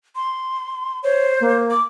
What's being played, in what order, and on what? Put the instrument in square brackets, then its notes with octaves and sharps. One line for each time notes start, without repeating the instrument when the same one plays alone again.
[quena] C6
[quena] C5 [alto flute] C#5
[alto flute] A#3
[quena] D6